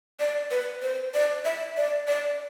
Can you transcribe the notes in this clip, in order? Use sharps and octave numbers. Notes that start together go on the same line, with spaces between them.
D5
B4
C5
D5
E5
D5
D5